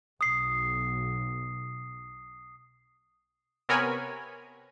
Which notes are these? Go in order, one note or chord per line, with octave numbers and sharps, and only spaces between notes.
B1 D#6 C7
C3 B3 A#4 C#5 G#5 B5